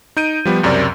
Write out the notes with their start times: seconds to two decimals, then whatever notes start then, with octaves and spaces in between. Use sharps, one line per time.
0.17 D#4 G6 D7 D#7
0.45 F3 G3 B3
0.63 C#2 F#2 C3 A#4 D5